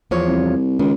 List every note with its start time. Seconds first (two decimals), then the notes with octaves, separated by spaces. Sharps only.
0.11 E2 F3 C#5
0.27 C2
0.79 C#2 D#3